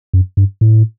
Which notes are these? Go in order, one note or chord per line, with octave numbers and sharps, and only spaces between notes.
F#2
G2
A2